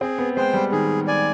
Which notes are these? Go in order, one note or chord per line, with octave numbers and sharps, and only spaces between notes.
C4 G#4
B3
G#3 C5 G5
G3
D#3 G#4
D5 G#5